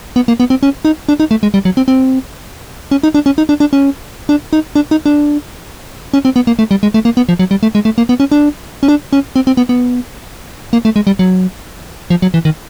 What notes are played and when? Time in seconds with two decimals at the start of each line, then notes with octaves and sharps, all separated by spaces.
0.16 B3
0.28 A#3
0.40 B3
0.50 C4
0.63 C#4
0.85 D#4
1.09 D4
1.20 D#4
1.31 A3
1.43 G#3
1.54 G3
1.65 F#3
1.77 C4
1.88 C4
2.91 C#4
3.03 D#4
3.15 D4
3.26 C#4
3.38 D#4
3.49 D4
3.60 D4
3.73 C#4
4.29 D4
4.53 D#4
4.76 D4
4.91 D#4
5.06 D4
6.14 C#4
6.25 C4
6.36 B3
6.47 A#3
6.59 A3
6.71 G3
6.83 G#3
6.94 A3
7.05 A#3
7.17 B3
7.29 F3
7.39 F#3
7.51 G3
7.63 A3
7.75 G#3
7.85 A3
7.98 A#3
8.09 B3
8.20 C#4
8.32 D4
8.83 C#4
8.88 D4
9.13 C#4
9.36 C4
9.47 C4
9.57 B3
9.69 B3
10.73 A#3
10.85 A3
10.96 G#3
11.07 G3
11.19 F#3
12.10 F3
12.22 F#3
12.34 E3
12.45 D#3